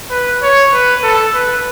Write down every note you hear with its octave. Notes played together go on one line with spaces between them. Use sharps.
B4
C#5
B4
A4
B4